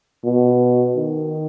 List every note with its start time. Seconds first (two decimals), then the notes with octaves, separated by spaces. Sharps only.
0.24 B2
0.96 D#3